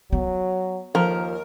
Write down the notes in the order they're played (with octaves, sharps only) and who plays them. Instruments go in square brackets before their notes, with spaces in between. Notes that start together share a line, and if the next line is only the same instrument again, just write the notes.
[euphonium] F#3 [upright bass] B3
[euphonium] D#2 [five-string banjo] F3 [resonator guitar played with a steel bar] A#4